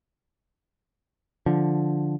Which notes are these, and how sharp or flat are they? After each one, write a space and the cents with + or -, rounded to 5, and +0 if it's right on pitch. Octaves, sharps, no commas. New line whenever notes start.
D3 +0 F3 +0